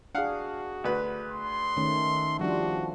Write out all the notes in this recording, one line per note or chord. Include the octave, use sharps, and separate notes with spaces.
D4 F#4 G#4 F5 F#5
D2 B4
C6
D#3 A3 C#4
F3 G3 D4 F#4